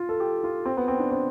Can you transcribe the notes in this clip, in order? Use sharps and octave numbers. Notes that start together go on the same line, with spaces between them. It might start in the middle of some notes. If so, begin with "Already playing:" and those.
Already playing: F4
A4
G4
F4
C4
B3
C4
D4
C4